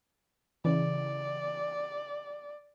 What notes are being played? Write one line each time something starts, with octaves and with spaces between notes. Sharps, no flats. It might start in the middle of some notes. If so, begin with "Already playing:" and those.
C#3 E3 D5